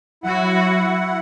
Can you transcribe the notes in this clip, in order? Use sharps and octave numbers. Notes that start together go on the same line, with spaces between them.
F#3 E4 F#4 F#5